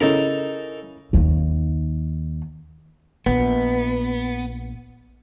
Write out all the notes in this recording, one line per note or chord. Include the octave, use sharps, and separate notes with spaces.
C#3 D#4 E4 A4 A#4
D#2 D#3
A#1 B3